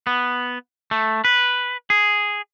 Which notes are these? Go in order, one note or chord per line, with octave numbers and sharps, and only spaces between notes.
B3
A3
B4
G#4